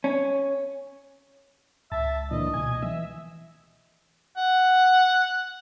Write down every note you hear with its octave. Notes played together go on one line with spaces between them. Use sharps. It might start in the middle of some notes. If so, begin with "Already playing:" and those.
C#4
C#2 E5 A5
A#2 D3 E3 D#5
B2 G#5
E3 E5
F#5